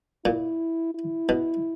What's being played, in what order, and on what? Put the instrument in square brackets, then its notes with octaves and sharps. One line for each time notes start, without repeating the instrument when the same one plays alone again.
[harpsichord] A#2 [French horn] E4
[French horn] E4
[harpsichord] B2